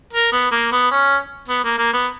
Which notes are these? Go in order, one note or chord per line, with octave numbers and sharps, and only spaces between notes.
A#4
B3
A#3
B3
C#4
B3
A#3
A#3
B3